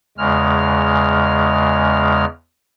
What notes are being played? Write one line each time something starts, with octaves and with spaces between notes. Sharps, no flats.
E2 C#3 G#3 F6